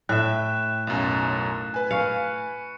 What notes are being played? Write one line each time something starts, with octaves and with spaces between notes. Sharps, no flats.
A2 E5 G5 F#6 E7
B1 F#2
B4 G#5
F5 C#6 C#7